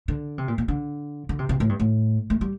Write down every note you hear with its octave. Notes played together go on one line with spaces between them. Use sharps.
D3
C3
A#2
A#2
D3
D3
C3
C3
A2
G2
A2
A3
G3